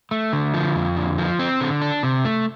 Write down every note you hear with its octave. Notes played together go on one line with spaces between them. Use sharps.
A3
D3
F3
F2
D3
F3
C4
D3
D4
C3
A3